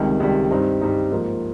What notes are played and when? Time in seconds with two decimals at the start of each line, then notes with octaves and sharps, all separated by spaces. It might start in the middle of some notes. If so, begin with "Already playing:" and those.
Already playing: C#2 C3 D#3 G3
0.20 C#2 C3 D#3 G3
0.51 G2 G3 C4 D#4
0.81 G2 G3 C4 D#4
1.11 G#2 F3 A#3